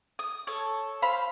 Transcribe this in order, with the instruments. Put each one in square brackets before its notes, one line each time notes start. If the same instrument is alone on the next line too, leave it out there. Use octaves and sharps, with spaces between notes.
[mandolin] D#6
A4 C#5
C5 F5 B5